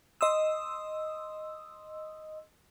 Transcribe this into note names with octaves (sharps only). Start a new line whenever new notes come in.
D#5 C6 D#6 E6